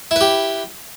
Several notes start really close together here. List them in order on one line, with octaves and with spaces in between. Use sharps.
E4 B4 G4